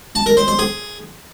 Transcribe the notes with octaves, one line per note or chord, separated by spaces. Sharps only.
A5
A#4
C5
C5
G#4